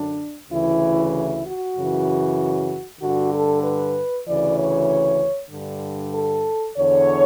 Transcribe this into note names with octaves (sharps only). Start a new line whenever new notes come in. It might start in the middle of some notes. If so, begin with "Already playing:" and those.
Already playing: F#2 D3 D4
D2 C#3 E3 E4
E4
F#4
F#2 C#3 E3
G2 D3 F#4
A4
B4
D2 C#3 E3 D5
C#5
G2 D3
A4
E2 D3 C#5